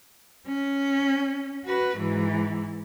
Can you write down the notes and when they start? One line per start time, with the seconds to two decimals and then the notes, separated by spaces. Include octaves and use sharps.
0.47 C#4
1.65 F#4 B4
1.98 G#2 E3